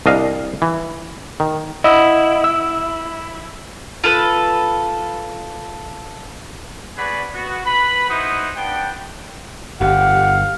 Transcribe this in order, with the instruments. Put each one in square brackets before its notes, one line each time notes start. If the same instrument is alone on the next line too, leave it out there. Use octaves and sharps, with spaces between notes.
[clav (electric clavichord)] C2 D4 D#5 F5
E3
D#3
[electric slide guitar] E4 [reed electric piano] D#5 F#5 E6
[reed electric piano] E6
[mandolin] F4 A4 B4 F#6
[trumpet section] B3 F#4 G#4 B4 D5 B5
B3 F#4
B4 B5
D#4 E4 F#4 B4 C5 D#6
B3 D4 G5
[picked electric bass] G1 [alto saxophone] G4 [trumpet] F5 [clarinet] F#5